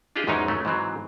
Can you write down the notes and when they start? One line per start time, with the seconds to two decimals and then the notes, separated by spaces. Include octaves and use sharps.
0.16 D4 D#4 F4 G4 G#4 D#5
0.27 E2 G#2 F#3 C#4 D#4 A#4
0.48 F#3 A3 C#4
0.65 G#2 E3 F#3 C4